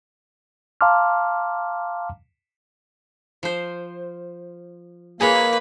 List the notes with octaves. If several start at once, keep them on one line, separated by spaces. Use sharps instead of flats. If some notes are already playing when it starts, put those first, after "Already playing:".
F5 A5 A#5 C6 D6 F6
F3 C5
A#3 F4 G#4 B4 C#5 D#5